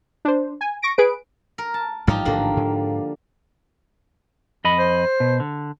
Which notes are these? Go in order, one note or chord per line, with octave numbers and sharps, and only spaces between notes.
D4 C5
G#5
C#6 A#6 D7
G#4 B4 D7
A#4
A5
A1 G#2 F3 G3 D#4 G4
A1 G#2 D3 A#3
G#2
F2 D#5 B5
C5
B2
D3